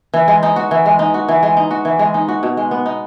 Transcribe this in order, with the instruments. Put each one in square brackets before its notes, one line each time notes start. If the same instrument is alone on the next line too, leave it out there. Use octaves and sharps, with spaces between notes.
[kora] E3
G#3
D#4
F#4
E3
G#3
D#4
F#4
E3
G#3
D#4
F#4
E3
G#3
D#4
F#4
B2
G#3
B3
D#4